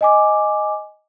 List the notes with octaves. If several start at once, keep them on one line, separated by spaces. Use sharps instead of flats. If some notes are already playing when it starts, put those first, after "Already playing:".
D#5 G#5 D6